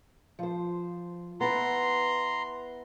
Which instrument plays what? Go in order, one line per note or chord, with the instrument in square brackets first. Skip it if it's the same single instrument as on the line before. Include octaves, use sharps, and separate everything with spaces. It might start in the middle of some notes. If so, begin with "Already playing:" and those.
[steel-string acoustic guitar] F3 C5
[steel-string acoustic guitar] B3 E4 [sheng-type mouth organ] A#5 C6